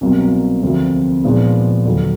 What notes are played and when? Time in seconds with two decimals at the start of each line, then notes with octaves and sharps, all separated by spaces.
0.01 C2 B2 F#3 A#3
0.62 D2 C3 F3 A#3
1.23 A#2 F3 G#3 B3 D#4
1.85 D#2 D3 F#3